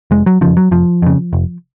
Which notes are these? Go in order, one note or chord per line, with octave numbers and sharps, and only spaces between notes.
F1 G#3
F#3
F2 C#3 F3
F#3
F1 F3
F2 C#3
F1